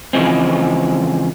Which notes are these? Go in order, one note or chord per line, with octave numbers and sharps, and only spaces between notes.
C#3 E3 F3 G#3 C4